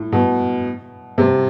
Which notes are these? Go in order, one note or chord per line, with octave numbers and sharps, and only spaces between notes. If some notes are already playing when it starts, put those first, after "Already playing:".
Already playing: A2
B2
C3